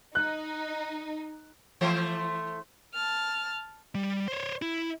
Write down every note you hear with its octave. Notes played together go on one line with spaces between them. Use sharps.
D#4 F#6
E3 A3 C5
A5 F6
G3
C5 C#5
E4